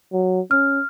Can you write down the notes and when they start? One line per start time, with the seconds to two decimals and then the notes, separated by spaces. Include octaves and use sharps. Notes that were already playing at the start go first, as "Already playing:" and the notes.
0.12 F#3
0.51 C#4 F6